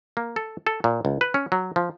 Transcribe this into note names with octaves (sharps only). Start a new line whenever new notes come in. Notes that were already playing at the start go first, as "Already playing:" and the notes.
A#3
A4
A4
A#2
C#2
B4
C#4
F#3
F3